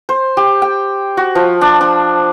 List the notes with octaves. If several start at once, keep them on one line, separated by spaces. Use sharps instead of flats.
C5
G4
G5
F#4
F3
D4
D4